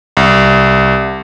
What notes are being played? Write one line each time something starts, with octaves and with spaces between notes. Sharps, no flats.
C2